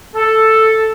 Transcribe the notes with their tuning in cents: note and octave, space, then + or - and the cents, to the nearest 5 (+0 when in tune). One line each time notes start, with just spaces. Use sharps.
A4 +5